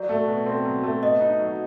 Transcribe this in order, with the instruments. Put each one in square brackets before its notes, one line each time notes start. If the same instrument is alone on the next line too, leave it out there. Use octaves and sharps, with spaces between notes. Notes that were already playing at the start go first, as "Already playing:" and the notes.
Already playing: [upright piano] F#3 [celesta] D5
[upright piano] A3
B2
C4
F#3
A3
[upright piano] B3 [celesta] D#5
[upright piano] D#4
F#3